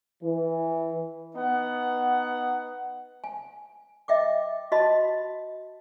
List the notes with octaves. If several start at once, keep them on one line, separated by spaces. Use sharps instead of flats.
E3
B3 D#4 F#5
G#5
D#5 E5 G5 D6
F#4 D#5 A5 B5